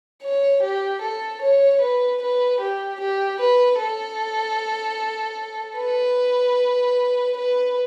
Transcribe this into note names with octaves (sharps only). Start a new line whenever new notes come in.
C#5
G4
A4
C#5
B4
B4
G4
G4
B4
A4
B4
B4